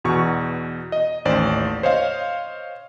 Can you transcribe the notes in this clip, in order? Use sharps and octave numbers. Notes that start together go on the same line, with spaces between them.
E2 B2 C#6
D#5
A1 D#2 C5 D5
C5 C#5 D#5 F5